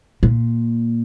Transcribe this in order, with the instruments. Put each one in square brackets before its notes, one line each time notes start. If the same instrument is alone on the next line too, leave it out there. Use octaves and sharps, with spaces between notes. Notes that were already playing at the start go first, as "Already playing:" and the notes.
[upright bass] A#2